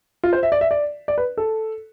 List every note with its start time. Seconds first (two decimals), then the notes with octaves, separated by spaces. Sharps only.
0.24 F4
0.33 C5
0.43 E5
0.52 D5
0.61 E5
0.71 D5
1.08 D5
1.18 B4
1.38 A4